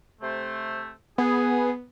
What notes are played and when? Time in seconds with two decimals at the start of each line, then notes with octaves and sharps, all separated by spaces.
0.22 C3 A3 C5
1.18 B3 G#4